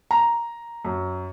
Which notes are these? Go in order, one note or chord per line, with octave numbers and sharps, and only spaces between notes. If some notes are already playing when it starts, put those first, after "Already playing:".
A#5
F#2